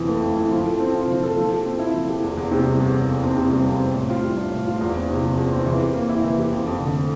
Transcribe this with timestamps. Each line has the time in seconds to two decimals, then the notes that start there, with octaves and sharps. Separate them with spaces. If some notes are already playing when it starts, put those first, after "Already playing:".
Already playing: F2 E3 E4
0.09 A3
0.22 F2
0.37 E4
0.51 F3
0.66 A4
0.80 C4
0.94 F4
1.08 F3
1.23 A4
1.37 F3
1.52 G4
1.66 C4
1.79 E4
1.94 F3
2.08 G4
2.23 E2
2.37 E2
2.51 C3
2.66 G3
2.80 E2
2.94 E2
3.08 F2
3.23 C4
3.37 C3
3.52 G3
3.66 F2
3.80 C4
3.94 A2
4.09 F4
4.23 G3
4.37 D4
4.52 A2
4.66 F4
4.81 E2
4.95 C4
5.09 C3
5.24 F3
5.38 E2
5.52 C4
5.66 E3
5.81 G4
5.94 A#3
6.09 E4
6.24 E3
6.38 G4
6.52 F2
6.67 F2
6.80 D3
6.95 A3